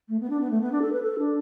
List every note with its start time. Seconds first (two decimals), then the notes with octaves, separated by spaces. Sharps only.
0.09 A3
0.20 B3
0.30 D4
0.41 B3
0.51 A3
0.61 B3
0.72 D4
0.82 A4
0.92 B4
1.03 A4
1.18 D4